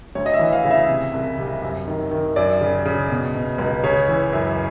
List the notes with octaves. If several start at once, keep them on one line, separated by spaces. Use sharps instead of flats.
D2 C#5
D#5
E5
E3
F5
C#3
E5
C3
C2
C3
F#2
D#3
D#3
F#2 D5
C#3
C#3
B2
B2
C#2
C#3 C#5
E3
F#2